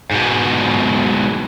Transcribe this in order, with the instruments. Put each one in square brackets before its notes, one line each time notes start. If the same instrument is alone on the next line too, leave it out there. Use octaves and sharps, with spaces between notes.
[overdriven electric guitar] G#2 B2